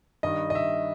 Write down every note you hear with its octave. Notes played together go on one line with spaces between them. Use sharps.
G2 D#3 G3 D#5
D#5
E5